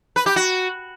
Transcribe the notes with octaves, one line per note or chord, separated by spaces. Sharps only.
B4
G4
F#4